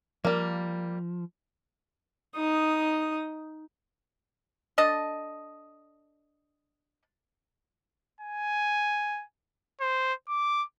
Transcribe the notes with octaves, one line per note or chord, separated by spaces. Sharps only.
F3 G3 A#3
D#4 D#6
D4 A4 D#5
G#5
C5
D6